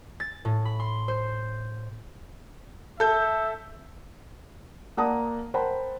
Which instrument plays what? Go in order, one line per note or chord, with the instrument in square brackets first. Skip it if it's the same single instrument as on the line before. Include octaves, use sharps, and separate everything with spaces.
[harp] A6
A2
B5
C6
C5
[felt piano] A4 G6 [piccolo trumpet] E5
[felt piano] A#3 D5 F#5 A5 A#5 D#6
A#4 C5 F#5 G5 A5 B5